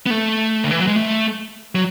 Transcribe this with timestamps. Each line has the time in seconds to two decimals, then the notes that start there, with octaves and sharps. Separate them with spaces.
0.06 B3
0.11 A3
0.64 D3
0.71 E3
0.79 F#3
0.87 G#3
0.96 A3
1.75 F#3